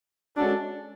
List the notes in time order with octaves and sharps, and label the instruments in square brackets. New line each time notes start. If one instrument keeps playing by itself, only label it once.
[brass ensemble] G#3 C#4 F#4 A4 [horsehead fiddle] D4